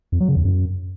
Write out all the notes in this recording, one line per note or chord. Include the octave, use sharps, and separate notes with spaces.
F2
F#3
C#3
E2
F#2